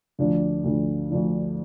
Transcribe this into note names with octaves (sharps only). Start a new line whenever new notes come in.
D2 D3 F3 D4
D2 D3 F3 D4
D2 D3 F3 D4